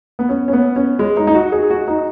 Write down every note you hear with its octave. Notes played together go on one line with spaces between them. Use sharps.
B3
C#4
C#4
B3
C#4
G#3
D#4
D#4
F#4
G#4
F#4
D#4